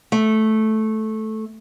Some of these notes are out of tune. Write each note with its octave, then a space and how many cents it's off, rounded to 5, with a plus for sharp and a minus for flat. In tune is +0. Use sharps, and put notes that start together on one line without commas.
A3 -10